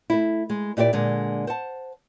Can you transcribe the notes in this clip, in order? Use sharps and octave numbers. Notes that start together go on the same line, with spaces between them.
A3 E4
G#3
A#2 E4 G4 C#5 D5
A#2 D3 G#3
C5 F#5 A5